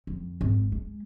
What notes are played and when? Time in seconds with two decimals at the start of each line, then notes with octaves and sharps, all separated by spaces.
0.07 F2
0.41 G#1
0.72 G#3